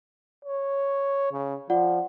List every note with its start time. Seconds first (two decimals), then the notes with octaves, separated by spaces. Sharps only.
0.45 C#5
1.32 C#3
1.70 F3 F4 D5 F#5